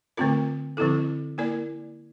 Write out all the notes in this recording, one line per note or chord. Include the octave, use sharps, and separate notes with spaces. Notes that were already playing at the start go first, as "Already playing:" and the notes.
D3 A3 C4 F4 A#4
D3 F3 C4 E4 A4
A#3 E4 A#4 D5